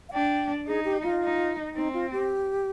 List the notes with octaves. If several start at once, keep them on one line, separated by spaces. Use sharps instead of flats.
F5
D4 G5
D#4 G#4
G4
F4
D#4
C4 D#4
F4
G4